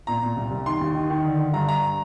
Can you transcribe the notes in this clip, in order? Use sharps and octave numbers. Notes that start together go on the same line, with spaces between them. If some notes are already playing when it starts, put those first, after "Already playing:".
A#2 A#5
A#2
C2
C2
D#3 C6
D#2
D#3
D#3
D3
D3
G2 A#5
G2 A#5